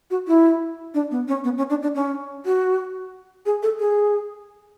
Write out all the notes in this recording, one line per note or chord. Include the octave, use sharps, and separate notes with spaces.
F#4
E4
D4
B3
C#4
B3
C#4
D4
D4
C#4
F#4
G#4
A4
G#4